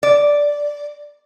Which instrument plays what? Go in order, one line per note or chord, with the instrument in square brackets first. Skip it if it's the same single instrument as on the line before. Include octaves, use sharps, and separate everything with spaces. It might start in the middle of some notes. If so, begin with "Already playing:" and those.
[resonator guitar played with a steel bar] D5